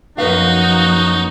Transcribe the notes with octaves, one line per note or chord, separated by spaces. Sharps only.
F#2 F3 A#3 D#4 F#4 B4 F5